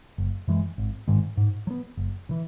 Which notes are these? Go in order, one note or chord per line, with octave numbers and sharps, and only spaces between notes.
F#1
F#2 E3 G#3
G#1
G#2 D#3 G#3
G#2
F#3
B3
F#1
C#3 E3